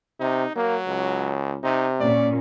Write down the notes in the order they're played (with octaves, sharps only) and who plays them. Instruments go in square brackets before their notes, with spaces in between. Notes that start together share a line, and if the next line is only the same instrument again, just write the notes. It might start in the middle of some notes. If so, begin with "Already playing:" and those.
[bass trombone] C3 [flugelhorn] D#4
[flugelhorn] F#3 [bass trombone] A#3
[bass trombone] C#2
[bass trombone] C3 [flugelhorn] D#4
[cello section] A#2 C#4 [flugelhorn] D5